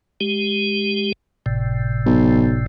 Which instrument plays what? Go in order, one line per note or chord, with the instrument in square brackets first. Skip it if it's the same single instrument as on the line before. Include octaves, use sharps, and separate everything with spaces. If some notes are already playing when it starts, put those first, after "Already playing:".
[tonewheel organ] G#3 G4
G1 A2 C3
[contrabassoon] B1